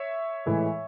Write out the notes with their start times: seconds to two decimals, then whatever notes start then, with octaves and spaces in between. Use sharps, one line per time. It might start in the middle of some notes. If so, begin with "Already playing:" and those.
Already playing: C#5 E5
0.46 A2 E3 G#3